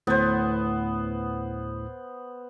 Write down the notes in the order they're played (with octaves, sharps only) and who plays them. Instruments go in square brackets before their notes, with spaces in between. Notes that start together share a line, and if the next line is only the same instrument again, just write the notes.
[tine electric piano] D2 A2 [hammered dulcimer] B3 C5